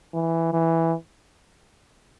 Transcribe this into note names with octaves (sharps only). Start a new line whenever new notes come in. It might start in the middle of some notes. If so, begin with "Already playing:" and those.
E3
E3